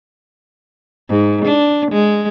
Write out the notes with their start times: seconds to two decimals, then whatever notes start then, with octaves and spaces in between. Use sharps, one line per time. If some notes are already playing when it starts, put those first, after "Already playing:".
1.09 G#2
1.45 D4
1.91 G#3